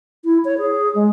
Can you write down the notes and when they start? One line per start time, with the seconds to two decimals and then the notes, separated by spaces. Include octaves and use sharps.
0.24 E4
0.45 C#5
0.58 G#4
0.95 G#3